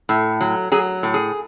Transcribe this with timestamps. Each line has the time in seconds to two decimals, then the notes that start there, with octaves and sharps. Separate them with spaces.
0.09 A2
0.41 F#3
0.72 F#3 G#4
1.03 A2
1.14 G#4